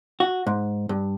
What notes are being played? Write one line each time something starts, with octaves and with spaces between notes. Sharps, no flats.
F#4
G#2
G2